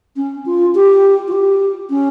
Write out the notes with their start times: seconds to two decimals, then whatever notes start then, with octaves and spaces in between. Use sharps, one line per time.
0.16 C#4
0.46 F4
0.75 G4
1.28 F4
1.32 G4
1.90 C#4